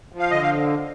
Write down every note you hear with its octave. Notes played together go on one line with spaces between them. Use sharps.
F3
F5
D3 D#5
F5